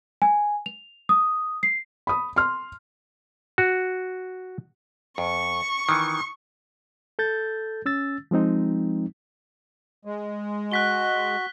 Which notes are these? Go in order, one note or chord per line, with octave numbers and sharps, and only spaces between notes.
G#5
F7
D#6
C7
B5 D#6
C6 F6
F#4
F2 C#6
D#3 E3
A4 G6 A6
C#4 E6 A6
F3 G#3 C4 D#4
G#3
F#4 F#6 B6 G7